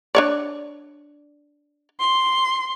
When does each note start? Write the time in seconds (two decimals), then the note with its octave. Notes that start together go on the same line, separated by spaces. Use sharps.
0.15 D4 C#5 D5
2.00 C6